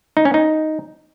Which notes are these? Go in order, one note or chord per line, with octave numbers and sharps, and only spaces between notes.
D#4
C#4
D#4